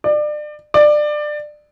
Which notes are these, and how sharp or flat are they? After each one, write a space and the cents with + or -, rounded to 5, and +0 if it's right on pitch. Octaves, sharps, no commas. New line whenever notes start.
D5 +30
D5 +20